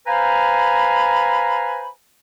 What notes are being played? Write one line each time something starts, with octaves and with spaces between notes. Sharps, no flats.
B4 C5 F5 G#5 A#5 B5